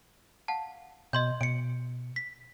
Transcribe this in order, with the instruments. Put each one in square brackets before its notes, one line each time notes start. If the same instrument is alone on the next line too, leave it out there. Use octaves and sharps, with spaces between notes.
[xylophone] F5 F#5 A5
[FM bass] B2 [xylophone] D#5 C6 G6
[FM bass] B2 [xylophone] C#7 D7
[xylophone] B6